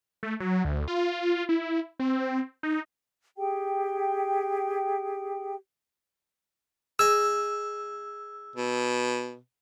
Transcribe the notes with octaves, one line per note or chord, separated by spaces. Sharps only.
A3
F#3
D2
F4
E4
C4
D#4
G4 G#4 G5
G#4 D#5 E6
B2